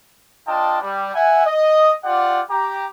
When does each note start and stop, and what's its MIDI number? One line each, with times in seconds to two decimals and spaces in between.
0.47 0.78 62
0.47 0.78 65
0.47 0.78 72
0.47 0.78 75
0.47 0.78 79
0.47 0.78 81
0.81 1.10 55
1.14 1.41 76
1.14 1.41 78
1.14 1.41 80
1.45 1.93 75
2.04 2.41 65
2.04 2.41 67
2.04 2.41 74
2.04 2.41 78
2.49 2.86 67
2.49 2.86 82